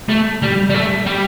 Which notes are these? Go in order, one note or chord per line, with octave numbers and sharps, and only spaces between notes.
A3
G3
G3
A3
G3